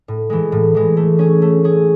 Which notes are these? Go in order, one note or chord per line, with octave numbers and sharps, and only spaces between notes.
A2
E3 G#3
A2
E3 G#3
A3
C#4 G#4
A3
C#4 G#4